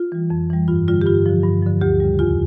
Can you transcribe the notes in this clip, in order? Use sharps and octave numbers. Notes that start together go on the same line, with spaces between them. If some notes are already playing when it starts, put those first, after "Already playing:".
Already playing: F4
E3 G3
F2
E3 G3
G2 F4
D3 G3 F4
G4
G2 F4
D3 F3
G2
D3 F3
D2 G4
C#3 G3
E2 F4